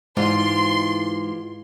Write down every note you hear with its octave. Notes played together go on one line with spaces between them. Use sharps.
G#2 E3 F4 G4 C6